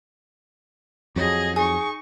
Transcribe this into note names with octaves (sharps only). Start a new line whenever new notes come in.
F2 F#3 G#4 D#5
D#4 G#4 C#6